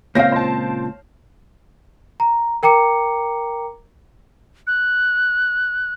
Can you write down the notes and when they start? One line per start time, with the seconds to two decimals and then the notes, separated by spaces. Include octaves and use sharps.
0.15 C#2 A#2 C4 C#5 F5 G6 A#6
0.32 C5 A5
2.20 A#5
2.63 A#4 G5 A#5 D6 C#7
4.67 F#6